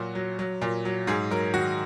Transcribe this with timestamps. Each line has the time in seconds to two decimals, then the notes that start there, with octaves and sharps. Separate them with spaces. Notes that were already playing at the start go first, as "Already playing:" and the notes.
Already playing: A#2 F#3 F#4
0.15 F#3
0.39 F#3
0.62 A#2
0.85 F#3
1.07 G#2 G#4
1.31 F#3 A#4
1.54 D#3 F#4